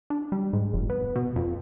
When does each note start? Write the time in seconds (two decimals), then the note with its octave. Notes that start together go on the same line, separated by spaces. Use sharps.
0.10 D4
0.32 G3
0.53 G#2
0.73 F1
0.90 B3
1.16 B2
1.36 F2